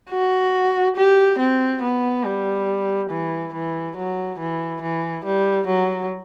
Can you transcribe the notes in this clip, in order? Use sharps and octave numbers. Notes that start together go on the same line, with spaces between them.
F#4
G4
C4
B3
G3
E3
E3
F#3
E3
E3
G3
F#3